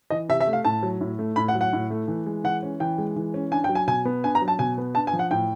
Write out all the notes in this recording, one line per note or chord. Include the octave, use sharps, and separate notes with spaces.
E3 D#5
C3 E5
E5
A3
F5
A2 A5
F#3
A2
A3
A2 B5
F#5
F#3
F#5
A2
A3
E3
G#3
E3 F#5
C#4
E3 G5
G#3
E3
C#4
D4 G#5
G5
F#3
G#5
B2 G#5
B3
D4 G#5
A#5
F#3
A5
B2 G#5
B3
D4 A5
G#5
F3
F#5
A2 G5